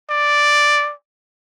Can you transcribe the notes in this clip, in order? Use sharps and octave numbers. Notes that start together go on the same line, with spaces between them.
D5